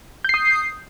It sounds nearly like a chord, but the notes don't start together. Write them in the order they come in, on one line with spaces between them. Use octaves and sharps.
G6 C7 D#6